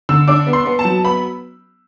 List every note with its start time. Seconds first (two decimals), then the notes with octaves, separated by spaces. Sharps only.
0.09 D3 E6
0.28 D4 D6
0.47 B3
0.53 C6
0.66 B3
0.79 A5
0.85 F#3
1.04 B3 B5